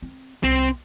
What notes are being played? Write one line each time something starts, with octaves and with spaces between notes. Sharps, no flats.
C4
C2 C4